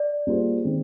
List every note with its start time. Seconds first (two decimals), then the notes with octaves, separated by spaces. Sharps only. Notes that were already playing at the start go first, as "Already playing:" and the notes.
Already playing: D5
0.27 G3 A#3 F4 G#4 C5
0.64 D#3 G#3 C4